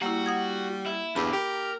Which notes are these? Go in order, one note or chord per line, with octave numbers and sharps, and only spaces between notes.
G3 A#3 E4 F#4
F#5 D#6 G#6
E4
E2 D3 G4 B5
G4 A#4